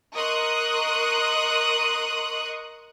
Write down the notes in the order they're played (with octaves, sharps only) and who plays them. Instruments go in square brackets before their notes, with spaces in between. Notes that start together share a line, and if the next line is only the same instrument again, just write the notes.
[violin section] A#4 D#5 C6 C#6 D#6 F#6